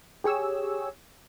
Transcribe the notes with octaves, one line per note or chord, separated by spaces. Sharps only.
G4 G#4 C#5 E6